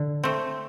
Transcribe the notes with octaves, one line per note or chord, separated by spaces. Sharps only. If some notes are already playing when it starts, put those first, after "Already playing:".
Already playing: D3
A3 C4